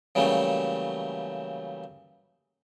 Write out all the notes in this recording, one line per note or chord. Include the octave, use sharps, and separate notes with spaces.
C#3 E3 F#3 G3 A3 A#3